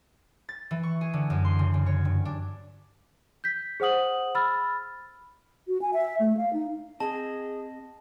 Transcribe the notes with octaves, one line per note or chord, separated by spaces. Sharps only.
A6
E3
C#6
G#4
D3
F#2
C6
C#3
C#3
C#5
G2
D4
G6 B6
G#4 C5 F#5 D#6 F#7
B5 E6 F6 A6
F#4
G#5
E5
A3
F5
D#4
C4 G#4 D#5 A5